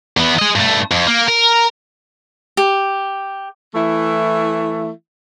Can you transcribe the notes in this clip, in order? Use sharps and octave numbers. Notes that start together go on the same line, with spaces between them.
E2 B3
G#4 D#5
G2 A3
F2
A#3
A#4
G4
E3 A3 E4